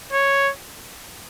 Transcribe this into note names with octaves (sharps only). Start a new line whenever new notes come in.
C#5